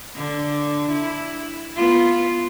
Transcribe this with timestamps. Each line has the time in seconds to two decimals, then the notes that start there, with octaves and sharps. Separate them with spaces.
0.15 D3
0.91 E4
1.76 B3 F4